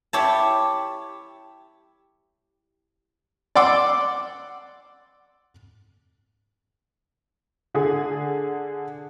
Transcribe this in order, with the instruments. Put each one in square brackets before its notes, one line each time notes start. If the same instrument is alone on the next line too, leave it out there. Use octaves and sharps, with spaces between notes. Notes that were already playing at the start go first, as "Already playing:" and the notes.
[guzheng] E4 G4 C#5 E5 G5 A5
[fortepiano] D5 F#5 C6 D6 E6
[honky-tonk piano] D3 G#4